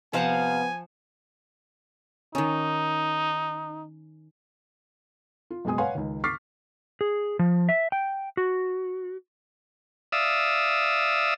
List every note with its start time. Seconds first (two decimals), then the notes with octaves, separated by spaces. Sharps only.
0.13 C3 F3 B3 C5 F5 F#5 G#5
2.35 D#3 C#4 D#4
5.50 F4
5.65 F#1 B2 G#3 G#5 D#6
5.78 B4 C#5 F5 F#5 G#5 C6
5.95 C#2 D#3
6.24 C#6 D6 F6 A6 B6 C7
7.01 G#4
7.39 F3
7.69 E5
7.92 G5
8.37 F#4
10.12 D5 E5 F5 D#6 E6